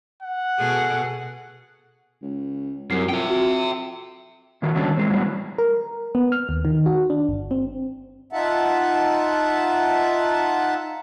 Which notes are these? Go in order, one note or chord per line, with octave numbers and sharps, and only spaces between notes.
F#5
B2 G#4 A4
C#2
C2 F#2 C7
F2 E5 G5
F#4
A#2 D#3 F#4 A4
D3 D#3 F#3 G3 C#4 D4
E3 G#3 C4
A2 F#3 G3 B3 F#4
A#4
B3
F6
D#2
D#3
F#4
D4
G1
C4
D#4 F4 E5 F#5 A5